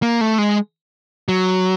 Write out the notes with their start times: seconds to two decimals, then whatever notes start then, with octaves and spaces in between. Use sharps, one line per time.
0.02 A#3
0.21 A3
0.38 G#3
1.28 F#3